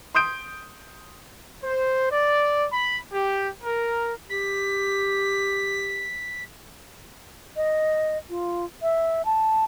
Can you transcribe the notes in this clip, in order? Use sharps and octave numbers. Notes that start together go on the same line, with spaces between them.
C6 D#6 G6 D7
C5
D5
B5
G4
A#4
G4 B6
D#5
F4
E5
A5